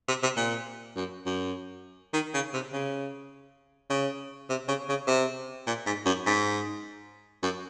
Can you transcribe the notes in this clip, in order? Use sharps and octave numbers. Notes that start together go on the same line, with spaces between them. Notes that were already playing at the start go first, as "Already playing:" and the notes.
C3
C3
A#2
F#2
F#2
D#3
C#3
C3
C#3
C#3
C3
C#3
C#3
C3
A#2
G#2
F#2
G#2
F#2